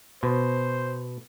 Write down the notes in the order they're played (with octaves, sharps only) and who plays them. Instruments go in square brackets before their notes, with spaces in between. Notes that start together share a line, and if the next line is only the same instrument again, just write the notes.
[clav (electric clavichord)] B2 [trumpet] C5